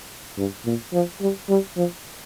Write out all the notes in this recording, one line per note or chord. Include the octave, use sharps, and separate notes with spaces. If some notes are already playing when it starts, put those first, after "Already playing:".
G2
A#2
F3
G3
G3
F3